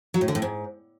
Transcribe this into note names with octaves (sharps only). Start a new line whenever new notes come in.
F#3
A2
D3
A2
G#2